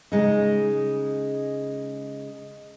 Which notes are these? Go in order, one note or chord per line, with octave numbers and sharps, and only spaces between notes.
C#3 G#3 D#4